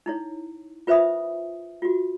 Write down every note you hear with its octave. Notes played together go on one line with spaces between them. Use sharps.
D#4 E4 C#5
F4 B4 C5 E5 B5 D#6
F4 F#4